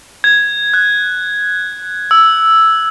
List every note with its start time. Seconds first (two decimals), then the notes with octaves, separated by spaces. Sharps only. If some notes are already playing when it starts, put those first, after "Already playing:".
0.24 G#6
0.74 F#6
2.11 E6